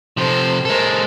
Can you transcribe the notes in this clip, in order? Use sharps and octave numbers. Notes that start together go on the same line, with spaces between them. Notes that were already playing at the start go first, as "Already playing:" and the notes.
C3 F3 A4 C5
G#3 A4 A#4 C5